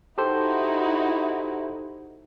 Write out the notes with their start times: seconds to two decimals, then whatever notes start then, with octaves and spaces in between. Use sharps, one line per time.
0.18 D#4 E4 F#4 G4 A4 C5